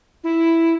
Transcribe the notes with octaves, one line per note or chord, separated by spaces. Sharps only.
E4